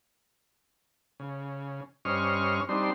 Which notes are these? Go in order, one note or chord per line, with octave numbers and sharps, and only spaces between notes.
C#3
G2 C#4 C5 D#5 C#6 F6
G3 C4 D4 D#4 C6